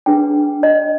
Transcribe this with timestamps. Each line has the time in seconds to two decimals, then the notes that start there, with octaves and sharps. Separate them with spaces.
0.06 D4 G#4 B4 G5
0.63 D#5